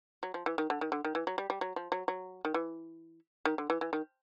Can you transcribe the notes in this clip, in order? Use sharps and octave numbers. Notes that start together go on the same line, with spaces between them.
F#3
F3
E3
D#3
D3
D#3
D3
D#3
E3
F#3
G3
G3
F#3
F3
F#3
F#3
D#3
E3
D#3
D3
E3
E3
D#3